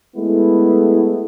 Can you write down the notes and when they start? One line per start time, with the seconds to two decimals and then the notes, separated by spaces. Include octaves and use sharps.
0.16 G#3 A3 B3 E4